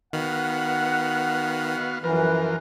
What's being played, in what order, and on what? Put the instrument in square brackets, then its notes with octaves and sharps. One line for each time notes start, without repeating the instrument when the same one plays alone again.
[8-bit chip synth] D#3 [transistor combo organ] B3 F#4 F5 [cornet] F#5
[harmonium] F#2 E3 B4 [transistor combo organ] F3 A#4